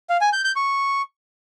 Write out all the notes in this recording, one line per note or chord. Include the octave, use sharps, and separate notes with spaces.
F5
G#5
G6
G6
C#6